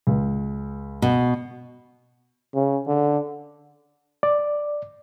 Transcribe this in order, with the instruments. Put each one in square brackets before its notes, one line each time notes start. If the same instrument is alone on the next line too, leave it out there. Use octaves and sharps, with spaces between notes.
[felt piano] C#2
[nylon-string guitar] B2
[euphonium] C#3
D3
[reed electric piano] D5